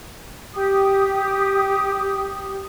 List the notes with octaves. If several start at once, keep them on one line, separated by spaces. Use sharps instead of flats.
G4 D#6